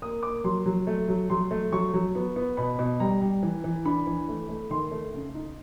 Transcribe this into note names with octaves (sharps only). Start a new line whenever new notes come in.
A#3 D#6
A#3 D6
F#3 C6
F#3
A3
F#3
F#3 C6
A3
F#3 C#6
F#3
B3
B3
B2 B5
B2
G3 A#5
G3
E3
E3
D4 B5
E3
A3
A3
D#3 C6
A3
C#3
D#4